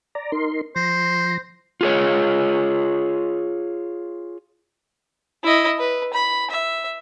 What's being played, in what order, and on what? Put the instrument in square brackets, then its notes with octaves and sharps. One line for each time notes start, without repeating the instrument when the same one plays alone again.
[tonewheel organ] D5 A#5
D#4 A#4 C6
[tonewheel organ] F3 A#6 [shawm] C5
[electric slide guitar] F4 G#4 C#5
[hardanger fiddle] E4 D#5
B4
B5
E5